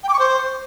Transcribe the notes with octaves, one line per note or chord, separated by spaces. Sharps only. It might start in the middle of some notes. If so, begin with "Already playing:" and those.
G5
D6
C#6
C5